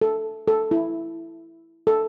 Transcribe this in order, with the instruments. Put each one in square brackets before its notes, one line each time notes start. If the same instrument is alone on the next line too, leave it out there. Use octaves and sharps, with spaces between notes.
[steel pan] A4
A4
E4
A4